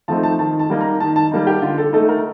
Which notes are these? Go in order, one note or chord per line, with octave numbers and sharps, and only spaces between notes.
F3 A3 C4 D#4 A5
A5
D#3 A5
A5
G3 A#3 D#4
A#5
D#3 A5
A5
G3 A#3 D#4
G4
D3 F4
A4
A3 D#4 A4
A#4